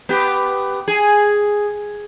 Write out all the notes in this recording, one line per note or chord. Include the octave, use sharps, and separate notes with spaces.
B3 G4
G#4